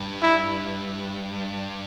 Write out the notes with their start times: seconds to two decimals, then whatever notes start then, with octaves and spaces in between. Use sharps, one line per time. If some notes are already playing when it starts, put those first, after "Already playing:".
Already playing: G2
0.22 E4